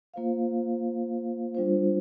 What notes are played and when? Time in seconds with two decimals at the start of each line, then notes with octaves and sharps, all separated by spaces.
0.14 A#3 F4 C5 F5
1.55 G3 D4 F4 C5